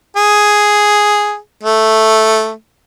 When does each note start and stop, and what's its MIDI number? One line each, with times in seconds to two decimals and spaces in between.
0.16 1.37 68
1.63 2.51 57